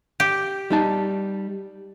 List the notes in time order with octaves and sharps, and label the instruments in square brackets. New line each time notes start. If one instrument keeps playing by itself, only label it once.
[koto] G4
[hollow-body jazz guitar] G3 D#4 A5